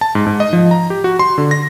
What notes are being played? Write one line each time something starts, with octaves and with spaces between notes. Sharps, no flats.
A5
G#2
G#2
D#5
F3
A#5
G4
F#4
C6
D3
A#6